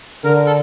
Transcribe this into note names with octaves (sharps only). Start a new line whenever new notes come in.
D3 A#4
A4